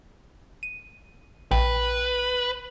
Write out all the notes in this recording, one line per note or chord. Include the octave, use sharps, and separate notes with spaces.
D#7
A#1 B4 G5